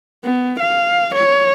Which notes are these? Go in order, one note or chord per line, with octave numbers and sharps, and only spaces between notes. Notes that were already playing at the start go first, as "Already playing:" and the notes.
B3
F5
C#5